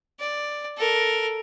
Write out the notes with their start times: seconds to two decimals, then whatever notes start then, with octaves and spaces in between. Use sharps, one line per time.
0.20 D5
0.78 A4 A#4